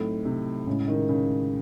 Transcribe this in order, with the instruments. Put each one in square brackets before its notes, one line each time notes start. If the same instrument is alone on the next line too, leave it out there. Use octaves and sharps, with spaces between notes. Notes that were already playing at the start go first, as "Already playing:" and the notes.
Already playing: [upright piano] A2 [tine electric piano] F#3 C4 D#4
[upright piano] C3
[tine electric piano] A2 G#3 C#4 E4 [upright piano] C#3
[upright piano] D#3
C#3